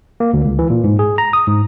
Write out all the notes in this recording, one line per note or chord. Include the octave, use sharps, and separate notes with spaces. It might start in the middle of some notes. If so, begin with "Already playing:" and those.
A#3
D2
C#2
E3
A#2
G#2
G#4
A#5
D#6
G#2